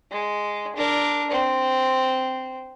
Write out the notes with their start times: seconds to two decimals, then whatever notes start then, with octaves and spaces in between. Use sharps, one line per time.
0.11 G#3
0.76 D4 A#4
1.31 C4